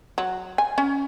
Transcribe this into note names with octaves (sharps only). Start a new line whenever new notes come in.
F#3
G#5
C#4